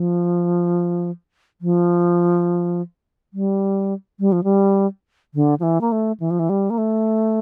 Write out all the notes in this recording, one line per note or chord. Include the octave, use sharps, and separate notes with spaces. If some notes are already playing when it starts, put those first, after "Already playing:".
Already playing: F3
F3
G3
G3
F3
G3
D3
F3
E3
A#3
A3
E3
F3
E3
G3
A#3
A3